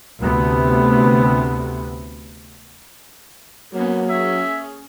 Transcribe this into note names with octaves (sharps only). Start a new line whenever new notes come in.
D2 C3 A3 B3
F#3 A#3 B3 C#4
C#4 G#4 E5